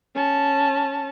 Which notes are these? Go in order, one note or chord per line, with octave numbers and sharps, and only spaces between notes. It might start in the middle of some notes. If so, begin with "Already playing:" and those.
C#4 A5